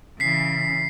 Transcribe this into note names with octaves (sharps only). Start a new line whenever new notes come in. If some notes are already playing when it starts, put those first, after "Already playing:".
C#3 E3 B6 C7